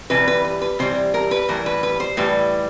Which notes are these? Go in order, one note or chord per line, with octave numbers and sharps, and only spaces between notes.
C3 E3 G3 B4
B4
B4
B4
C3 E3 G3 C5
A#4
B4
A2 E3 G3 A#4
B4
B4
C5
A2 E3 G3 B4